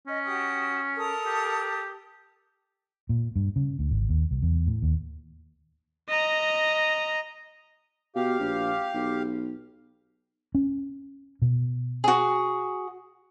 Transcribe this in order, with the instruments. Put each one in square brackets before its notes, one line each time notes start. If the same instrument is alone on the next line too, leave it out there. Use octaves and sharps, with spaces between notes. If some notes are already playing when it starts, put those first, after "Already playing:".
[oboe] C#4 [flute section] D#5
[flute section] F#4 G4 D#6
A4 A#4 D#6
[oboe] G4
[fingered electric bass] A#2
G2
C#3
D2
G#1
D#2
C2
E2
A2
D#2
[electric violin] D#5 A#5
[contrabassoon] B2 [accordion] G4 F5
[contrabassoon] A#1
B1
[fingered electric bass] C#4
B2
[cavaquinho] F#4 G#4